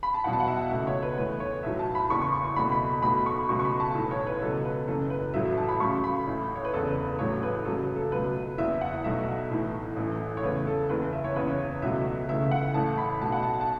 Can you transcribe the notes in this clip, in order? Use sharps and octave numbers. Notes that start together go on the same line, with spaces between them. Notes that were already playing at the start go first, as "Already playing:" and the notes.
B5
A5
E2 B2 F#3 F#5
A5
F#5
E5
C#2 B2 A3 E5
C#5
B4
E2 E3 A3 B4
C#5
B1 A2 F#3 E5
A5
B5
F#1 E2 E3 C#6
C#6
C#6
C#6
F#1 E2 B2 A3 B5
B5
B1 B2 A3 B5
C#6
C#2 B2 F#3 A3 C#6
C#6
B5
A5
B1 A2 E3 A4
C#5
B4
C#2 B2 F#3 A4
B4
F#1 F#2 E3 A4
B4
A1 A2 F#3 A3 E5
E5
A5
B5
C#2 C#3 F#3 A3 C#6
B5
A1 A2 A3
C#5
B4
E1 E2 C#3 A4
B4
B4
A1 A2 F#3 A3 C#5
B4
F#1 F#2 C#3 F#3 A4
A4
C#2 B2 F#3 A3 B4
F#1 E2 E3 E5
F#5
B1 B2 F#3 A3 E5
B1 A2 E3 A3
A1 A2 E3 A3
C#5
E2 C#3 A3 B4
A4
F#1 E2 E3 B4
E5
C#5
F#1 E2 C#3 E3 B4
C#5
C#2 B2 F#3 A3 E5
C#2 C#3 E3 A3 E5
F#5
A1 A2 A3 A5
B5
B1 B2 A3 A5
F#5
A5
A5